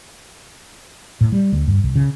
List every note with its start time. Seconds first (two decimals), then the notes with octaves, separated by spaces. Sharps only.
1.21 A2
1.32 G3
1.52 D2
1.67 G2
1.84 C2
1.96 C#3